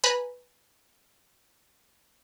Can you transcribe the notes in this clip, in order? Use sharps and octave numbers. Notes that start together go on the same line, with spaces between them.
B4 G#5 A#5 B5